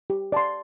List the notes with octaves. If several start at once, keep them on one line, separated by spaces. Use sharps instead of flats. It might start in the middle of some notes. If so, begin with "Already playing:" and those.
G4
D5 A5 C6